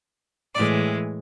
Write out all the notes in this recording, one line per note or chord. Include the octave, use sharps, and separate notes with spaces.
A2 E3 G#3 D5